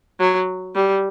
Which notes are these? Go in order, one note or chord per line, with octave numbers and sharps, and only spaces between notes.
F#3
G3